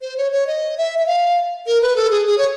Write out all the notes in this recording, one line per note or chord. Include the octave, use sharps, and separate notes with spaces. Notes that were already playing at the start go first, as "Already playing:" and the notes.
C5
C#5
C#5
D#5
E5
E5
F5
A#4
B4
A4
G#4
G#4
C#5